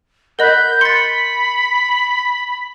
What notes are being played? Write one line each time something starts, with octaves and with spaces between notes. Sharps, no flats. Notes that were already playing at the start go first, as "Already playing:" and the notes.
A#4 D#5 F#5 B5 F#6 G6 B6
B5 C6 A6 C#7